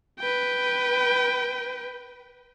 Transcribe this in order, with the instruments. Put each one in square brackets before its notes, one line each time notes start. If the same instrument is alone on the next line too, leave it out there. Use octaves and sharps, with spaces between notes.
[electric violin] B4 G5